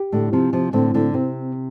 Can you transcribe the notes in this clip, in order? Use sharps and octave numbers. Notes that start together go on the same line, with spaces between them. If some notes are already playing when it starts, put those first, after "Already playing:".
Already playing: G4
A2 D3
C3 F3 C4
C3 F3
A2 D3 C4
A2 D3
C3 C4